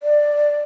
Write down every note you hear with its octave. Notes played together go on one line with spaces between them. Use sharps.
D5